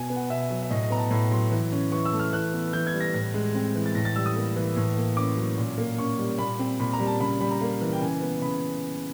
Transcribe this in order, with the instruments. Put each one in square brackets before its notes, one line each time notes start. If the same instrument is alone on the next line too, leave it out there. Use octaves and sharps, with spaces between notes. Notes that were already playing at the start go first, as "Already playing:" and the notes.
Already playing: [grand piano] B2 G#5
B3
F#5
B2 E5
F#3
E5
A2 D#5
D#5
B3 A#5
A5
A2 B5
F#3 C6
E3
C#4
E3 C#6
E6
A3
F6
E3 F#6
B3
E3 G6
G#6
G3
A#6
A2 A#6
G#3
C4
E3
A6
A2 A#6
A6
G3 E6
D#6
A#3
E3
A2
A#3
C#4 D6
F#3
A#2
A#3
C#4 C#6
G3
A#2 B5
C4
A#2 B5
A#5
G3
A5
C#3 B5
G3 B5
A#5
A#3
E3
G5
C#3 G#5
B3
C#3 B5